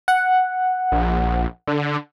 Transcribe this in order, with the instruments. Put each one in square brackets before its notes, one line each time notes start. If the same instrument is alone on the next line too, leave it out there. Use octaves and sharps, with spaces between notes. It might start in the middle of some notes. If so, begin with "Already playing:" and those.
[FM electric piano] F#5
[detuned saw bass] A#1
D3